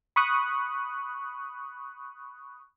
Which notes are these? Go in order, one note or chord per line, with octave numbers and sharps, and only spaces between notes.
B5 C#6 D#6 F#6